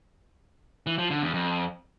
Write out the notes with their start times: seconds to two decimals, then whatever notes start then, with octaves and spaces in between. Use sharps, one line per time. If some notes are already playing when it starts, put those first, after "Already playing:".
0.87 E3
0.98 F3
1.10 D3
1.22 E2
1.34 F2